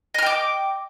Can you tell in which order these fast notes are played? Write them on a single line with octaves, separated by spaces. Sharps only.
D#5 F6 G5 D6